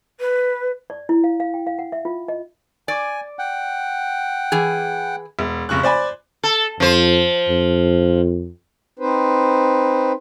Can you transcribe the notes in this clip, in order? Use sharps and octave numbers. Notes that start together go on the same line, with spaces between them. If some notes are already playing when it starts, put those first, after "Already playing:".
B4
D5
E4
F5
F5
G5
F5
F#5
E5
F4
D#5
D5 G#5
F#5 G5
E3 G#4
E1
F1 C#3 C#6 F#6
C5 D5 G#5 B5
A4
F2 F3 C5
F2
C4 D#4 B4 C5